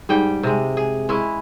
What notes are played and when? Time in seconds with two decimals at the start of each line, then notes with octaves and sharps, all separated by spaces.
0.09 G#2 G3 G5
0.43 C3 G#3
0.77 G#4
1.09 G#3 C#4 E4